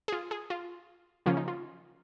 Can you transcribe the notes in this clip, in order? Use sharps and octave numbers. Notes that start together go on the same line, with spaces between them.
G#4
F4
G#4
F4
C#3 F3 A#3 C#4 F4
D#4
F4